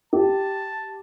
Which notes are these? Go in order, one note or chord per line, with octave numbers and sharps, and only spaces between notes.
G4 A5